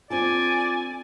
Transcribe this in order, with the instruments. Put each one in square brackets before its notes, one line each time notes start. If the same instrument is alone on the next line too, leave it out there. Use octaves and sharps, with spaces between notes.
[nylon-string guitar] C4 D4 A4 [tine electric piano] F4 D6 [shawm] D5 [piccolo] G#5